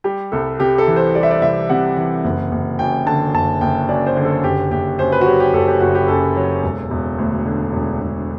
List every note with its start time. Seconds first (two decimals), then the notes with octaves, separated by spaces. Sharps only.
0.04 G3 G4
0.32 C2 A4
0.60 C3 G4
0.78 A4
0.87 E3
0.96 C5
1.15 G3 D5
1.23 E5
1.31 D5
1.42 C2 E5
1.69 C3 F#5
1.97 E3
2.24 F#1
2.52 F#1
2.79 F#2 G5
3.06 D3 A5
3.34 F#1 A5
3.61 F#1 G5
3.88 F#2 D5
4.07 C5
4.16 D3
4.25 A4
4.44 F#1 G4
4.71 F#1 G4
4.99 F#2 C5
5.12 B4
5.21 F#4
5.26 F#3 G4
5.40 G4
5.53 F#1 A4
5.68 G4
5.80 F#1 F#4
5.95 G4
6.08 F#2 A4
6.36 F#3
6.63 E1
6.90 E1
7.18 D2
7.45 D3
7.73 E1
8.01 E1